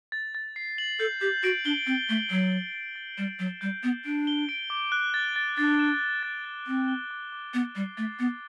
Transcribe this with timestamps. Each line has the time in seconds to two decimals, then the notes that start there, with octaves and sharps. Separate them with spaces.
0.12 A6
0.35 A6
0.56 C7
0.78 F#7
0.99 A4 G6
1.21 G4 G6
1.43 F#4 D7
1.65 D4 G7
1.86 C4 G6
2.08 A3 G6
2.30 F#3 C7
2.52 G7
2.74 A6
2.96 A6
3.18 G3 E7
3.39 F#3 G7
3.61 G3 G6
3.83 B3 G6
4.05 D4 D7
4.27 G7
4.49 D7
4.70 D6
4.92 F#6
5.14 A6
5.36 A6
5.58 D4 A6
5.79 E7
6.01 G7
6.23 A6
6.45 A6
6.67 C4 D7
6.88 G7
7.11 D6
7.32 D6
7.54 B3 F#6
7.76 G3 C7
7.97 A3 A6
8.19 B3 A6